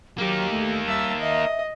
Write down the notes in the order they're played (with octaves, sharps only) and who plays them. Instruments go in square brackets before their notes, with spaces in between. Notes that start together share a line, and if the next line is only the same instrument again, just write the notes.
[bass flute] F#3 [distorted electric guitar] A#3 D#4 [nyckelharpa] G4
[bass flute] A3
[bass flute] G3 [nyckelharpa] E5 A5
[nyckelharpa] D#5 [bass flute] E5